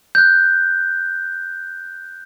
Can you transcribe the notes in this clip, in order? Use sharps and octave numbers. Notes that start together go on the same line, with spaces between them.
F#6 G6